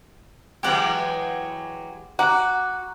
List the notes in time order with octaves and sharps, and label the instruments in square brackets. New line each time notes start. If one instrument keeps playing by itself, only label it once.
[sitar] E3 F#3 G#3 [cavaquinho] G4 F#5 G5
[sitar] F#4 [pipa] F#5 [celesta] A#5 F#6 [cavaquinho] D6